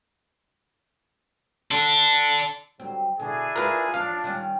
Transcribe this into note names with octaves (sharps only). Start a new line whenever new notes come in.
D4 A4
D3 F#3 G3 C4
B2 D3 D4 E4 G#4
C#3 A3 F4 A#4 B4
E2 F3 C#4 D4 F5
D#3 G3 C#4